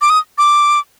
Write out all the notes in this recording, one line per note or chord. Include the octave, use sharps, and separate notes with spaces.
D6
D#6
D6